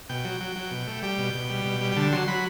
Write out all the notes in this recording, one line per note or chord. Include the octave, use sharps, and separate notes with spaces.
B2 G5
F#3
F#3
F#3
B2
A3
G3 G5
B2
B2
G3
B2
G3
G5
D3 A5
F#3 C6
F#3 B5